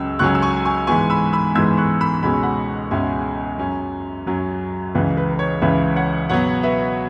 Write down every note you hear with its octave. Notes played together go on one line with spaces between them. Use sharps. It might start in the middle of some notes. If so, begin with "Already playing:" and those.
Already playing: C#2 C#3 F#3 C#4 E6
C#2 C#3 F#3 C#4 C#6 F#6
E6
G#5 C#6
G#5 C#6
G#2 E3 G#3 B3 G#5 C#6
B5 E6
B5 E6
G#2 E3 G#3 B3 E6 G#6
C#6 F#6
B5 E6
C#2 B2 G#3 C#4 B5
C#6
F#5 B5
C#2 B2 G#3 C#4 E5 G#5
F#2 F#3 C#4
F#2 F#3 C#4
C#2 C#3 E3 B4
B4
B4
C#5
C#2 C#3 E3 B4 E5
C#5 F#5
B2 F#3 B3 C#5 F#5
B4 E5